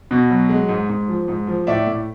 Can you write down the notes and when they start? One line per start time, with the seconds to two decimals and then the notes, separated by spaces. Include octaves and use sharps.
0.11 B2
0.30 F#3
0.49 G#3
0.68 G#2
0.89 G#2
1.08 F3
1.28 G#2
1.47 F3
1.67 A2 D5 E5
1.87 A2